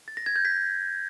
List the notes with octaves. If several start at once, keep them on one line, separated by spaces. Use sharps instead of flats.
A6
A#6
G#6
G6
B6